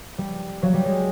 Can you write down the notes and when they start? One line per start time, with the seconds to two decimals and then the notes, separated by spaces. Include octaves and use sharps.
0.18 G3
0.62 F#3
0.74 G3
0.85 G#3